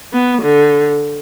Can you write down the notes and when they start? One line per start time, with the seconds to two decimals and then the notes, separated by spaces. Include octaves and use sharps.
0.13 B3
0.42 D3